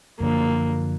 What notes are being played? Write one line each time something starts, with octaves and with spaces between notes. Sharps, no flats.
F#2 D3 F3 A#3